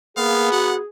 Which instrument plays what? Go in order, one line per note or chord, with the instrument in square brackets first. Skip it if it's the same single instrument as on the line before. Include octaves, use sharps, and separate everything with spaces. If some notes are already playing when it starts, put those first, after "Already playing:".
[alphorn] A#3 [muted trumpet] B3 [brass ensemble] G#4 [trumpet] F5
[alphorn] F#4 [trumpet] F#5